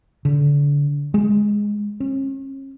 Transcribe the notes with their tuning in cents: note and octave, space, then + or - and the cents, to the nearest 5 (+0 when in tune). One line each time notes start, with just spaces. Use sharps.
D3 -30
G#3 -5
C#4 -40